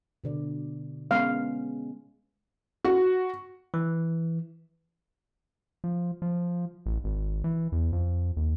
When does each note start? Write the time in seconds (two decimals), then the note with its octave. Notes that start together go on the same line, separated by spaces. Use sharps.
0.24 B2 D3 D5
1.11 G#3 B3 C#4 F5
2.85 F#4
3.74 E3
5.84 F3
6.22 F3
6.86 A1
7.04 G#1
7.44 E3
7.72 E2
7.93 F2
8.37 D#2